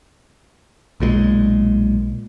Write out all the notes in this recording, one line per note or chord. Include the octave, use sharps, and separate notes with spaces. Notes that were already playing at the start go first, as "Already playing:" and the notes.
B1 A#2 F3 G#3